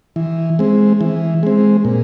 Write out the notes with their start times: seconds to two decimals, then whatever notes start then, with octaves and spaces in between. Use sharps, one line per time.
0.16 E3
0.59 G#3 C4
1.01 E3
1.43 G#3 C4
1.85 A#2